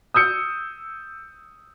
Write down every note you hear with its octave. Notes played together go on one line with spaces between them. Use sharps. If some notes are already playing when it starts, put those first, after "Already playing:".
D#6 E6 G6 C#7